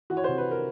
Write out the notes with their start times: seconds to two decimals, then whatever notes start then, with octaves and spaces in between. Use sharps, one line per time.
0.10 E3 F#4
0.17 C#5
0.24 C3 C5
0.38 B4
0.51 A#4